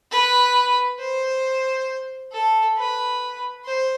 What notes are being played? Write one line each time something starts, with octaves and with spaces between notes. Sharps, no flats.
B4
C5
A4
B4
C5